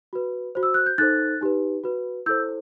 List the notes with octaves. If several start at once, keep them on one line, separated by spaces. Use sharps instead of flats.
F#4 B4
F#4 C5
E6
F#6
G6
D#4 A4 C5 F#6 A6
D#4 G4 B4
F#4 B4
E4 A4 C5 E6 G6